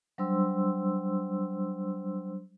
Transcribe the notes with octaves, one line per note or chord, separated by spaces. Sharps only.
F#3 G3 D4 C5 C6 E6